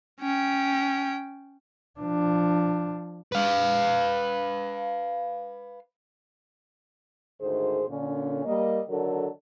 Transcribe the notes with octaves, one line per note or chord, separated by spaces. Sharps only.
C#4 G5
F3 D4
B4 F5
D2 G#2 D#3 G#4 C5
A#2 D3 C#4
G3 A#3 D#5
D3 D#3 F#3 D4 A4 A#4